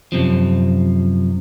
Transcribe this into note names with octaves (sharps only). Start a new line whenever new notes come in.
F#2 C3 F3